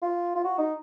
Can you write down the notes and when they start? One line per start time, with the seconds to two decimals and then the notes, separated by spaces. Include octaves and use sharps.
0.03 F4
0.36 F4
0.44 F#4
0.58 D#4